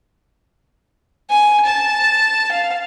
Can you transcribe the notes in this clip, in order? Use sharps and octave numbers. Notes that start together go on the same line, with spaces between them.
G#5
A5
F5